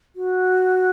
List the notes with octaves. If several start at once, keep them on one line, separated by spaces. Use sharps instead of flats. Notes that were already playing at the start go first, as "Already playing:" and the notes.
F#4